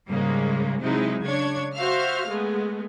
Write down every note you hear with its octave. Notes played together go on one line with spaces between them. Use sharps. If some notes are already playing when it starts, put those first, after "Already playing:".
G#2 C#3 G3 G#3 A#3
C3 F#3 G#3 D#4 E4
C#3 D4 C#5 G#6
F#4 C5 E5 F5 F6
G#3 A3 B3